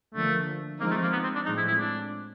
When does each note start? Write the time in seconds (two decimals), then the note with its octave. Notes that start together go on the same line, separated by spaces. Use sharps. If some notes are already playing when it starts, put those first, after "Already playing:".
0.14 D3 F3 A3 A#3
0.80 F3 G#3 A#3 C4 D#4
0.91 A3
1.03 A#3
1.12 B3
1.23 C4
1.35 D4
1.46 A2 F3 G#3 C4 D#4
1.57 E4
1.68 E4
1.79 D4